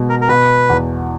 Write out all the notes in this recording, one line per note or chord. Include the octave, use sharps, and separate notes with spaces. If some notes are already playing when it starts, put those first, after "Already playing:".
Already playing: B2 G#3
A#4
A#4
B2 B4
E2